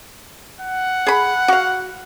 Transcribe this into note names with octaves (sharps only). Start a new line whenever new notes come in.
F#5
G#4 B5
F#4 F5